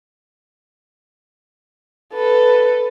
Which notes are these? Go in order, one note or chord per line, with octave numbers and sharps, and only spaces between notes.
A4 B4